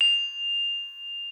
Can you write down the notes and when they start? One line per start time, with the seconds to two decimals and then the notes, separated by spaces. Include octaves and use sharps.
0.01 F7